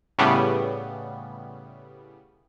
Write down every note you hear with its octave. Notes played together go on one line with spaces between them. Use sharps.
A2 C#3 G3 B3